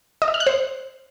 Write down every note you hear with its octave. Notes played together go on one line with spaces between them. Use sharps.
D#5
E5
F6
F#6
C5